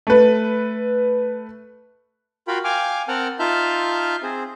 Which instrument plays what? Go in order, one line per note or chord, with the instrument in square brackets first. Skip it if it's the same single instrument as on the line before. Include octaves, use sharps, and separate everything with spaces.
[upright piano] A3 B4
[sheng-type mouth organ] F4 F#4 A#4 F5 G5 B5
F5 G5 G#5 D6 F6
C4 A#4 F#5 G5 A5 F6
D#4 F4 E5 A5 F6 G6
C4 G#4 C5